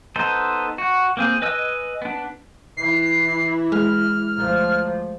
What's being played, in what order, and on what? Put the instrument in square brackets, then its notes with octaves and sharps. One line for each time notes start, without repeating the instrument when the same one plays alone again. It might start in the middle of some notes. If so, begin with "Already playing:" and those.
[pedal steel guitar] B3 D#4 A4 C5
F#4
A#3 C4 G#4
B4 D#5 G#5 E6
B3 D4
[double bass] E3 E4 [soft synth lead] C7
[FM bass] G#3 [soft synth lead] F6
[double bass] D2 F3